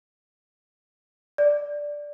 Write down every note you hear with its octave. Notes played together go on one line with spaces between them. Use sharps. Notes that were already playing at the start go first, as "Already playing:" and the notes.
D5